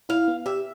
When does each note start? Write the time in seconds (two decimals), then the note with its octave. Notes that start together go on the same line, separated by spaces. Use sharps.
0.09 E4 F5
0.28 B3
0.46 G4 E5